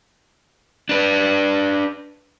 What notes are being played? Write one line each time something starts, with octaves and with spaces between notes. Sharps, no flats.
D4 B4